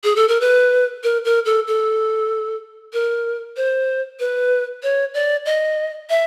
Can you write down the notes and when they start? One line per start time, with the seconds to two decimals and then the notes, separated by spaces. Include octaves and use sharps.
0.04 G#4
0.16 A4
0.28 A#4
0.41 B4
1.03 A#4
1.25 A#4
1.45 A4
1.67 A4
2.93 A#4
3.57 C5
4.20 B4
4.83 C#5
5.14 D5
5.46 D#5
6.10 E5